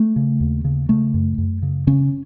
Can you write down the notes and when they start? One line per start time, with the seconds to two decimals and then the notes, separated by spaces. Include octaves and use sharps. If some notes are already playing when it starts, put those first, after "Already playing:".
Already playing: A3
0.16 C#3
0.40 D#2
0.65 C#3
0.89 C#3 A3
1.14 F#2
1.38 F#2
1.62 C#3
1.87 C#3 C#4